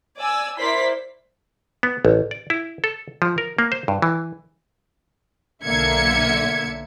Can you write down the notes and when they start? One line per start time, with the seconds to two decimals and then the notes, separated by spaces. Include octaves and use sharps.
0.17 D5 G#5 E6
0.58 E4 A#4 C5 D5 C6 B6
1.83 B3
2.05 A1
2.31 D5
2.50 E4
2.84 A4
3.22 F3
3.38 A#4
3.59 A#3
3.72 C5
3.88 G2
4.02 E3
5.64 B1 D3 A#3 E5 G#6 C#7